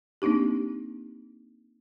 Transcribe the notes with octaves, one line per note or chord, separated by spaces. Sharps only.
A#3 C4 D4 D#4 G4